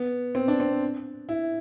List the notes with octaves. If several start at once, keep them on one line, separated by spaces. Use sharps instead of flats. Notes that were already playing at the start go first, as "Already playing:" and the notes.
Already playing: B3
C4
D4
C4
E4